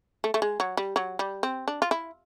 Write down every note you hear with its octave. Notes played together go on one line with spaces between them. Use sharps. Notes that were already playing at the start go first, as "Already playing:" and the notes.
A3
A3
G#3
F#3
G3
F#3
G3
C4
D4
F4
E4